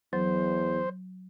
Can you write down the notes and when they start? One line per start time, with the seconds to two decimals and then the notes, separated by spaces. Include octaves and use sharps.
0.13 E2 F#3 C5